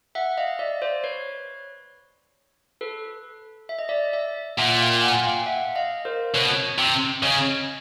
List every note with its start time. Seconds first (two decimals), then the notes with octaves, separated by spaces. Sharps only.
0.15 E5 F#5
0.37 D#5 F5
0.59 D5 E5
0.82 C5 D5
1.04 B4 C#5
2.81 A4 B4
3.69 E5
3.79 D#5
3.89 D5 E5
4.13 D5 E5
4.57 A#2 E5 F#5
4.80 F5 G5
5.01 F#5 G#5
5.24 F5 G5
5.46 E5 F#5
5.76 D#5 F5
6.05 A#4 C5
6.34 B2 B4 C#5
6.79 C3
7.23 C#3 C#5 D#5